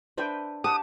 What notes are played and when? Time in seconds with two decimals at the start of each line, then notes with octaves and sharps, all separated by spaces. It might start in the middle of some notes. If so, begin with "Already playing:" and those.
0.18 D4 B4 C5 E5 G5
0.64 G4 F#5 A5 D6 D#6